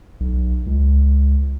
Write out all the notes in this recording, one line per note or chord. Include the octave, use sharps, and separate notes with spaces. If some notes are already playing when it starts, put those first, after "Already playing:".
B1
C#2